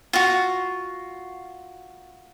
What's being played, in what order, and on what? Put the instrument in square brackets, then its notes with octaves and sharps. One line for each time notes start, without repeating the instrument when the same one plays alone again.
[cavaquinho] F4 F#4